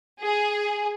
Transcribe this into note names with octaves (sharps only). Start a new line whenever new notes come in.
G#4